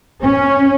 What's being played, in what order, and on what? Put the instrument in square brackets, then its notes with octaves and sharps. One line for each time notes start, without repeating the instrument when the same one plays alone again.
[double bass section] C#4